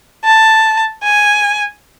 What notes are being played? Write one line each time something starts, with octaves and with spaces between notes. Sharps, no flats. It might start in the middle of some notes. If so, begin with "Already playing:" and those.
A5
G#5